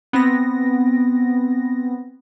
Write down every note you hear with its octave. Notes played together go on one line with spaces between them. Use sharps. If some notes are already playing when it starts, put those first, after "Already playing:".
B3 C4 A#6